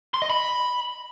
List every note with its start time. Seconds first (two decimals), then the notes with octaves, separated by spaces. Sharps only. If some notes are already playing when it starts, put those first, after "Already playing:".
0.14 C6
0.22 D#5
0.30 B5